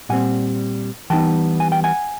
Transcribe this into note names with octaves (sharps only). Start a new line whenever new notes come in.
A#2 G3 C4 F#5 G#5
E3 G3 B3 D#4 G5 A5
G#5
G5
F#5 G#5